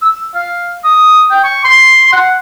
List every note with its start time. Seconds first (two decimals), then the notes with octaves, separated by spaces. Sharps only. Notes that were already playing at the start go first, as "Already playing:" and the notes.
0.02 E6
0.35 F5
0.84 D#6
1.30 G5
1.43 C#6
1.65 C6
2.12 F#5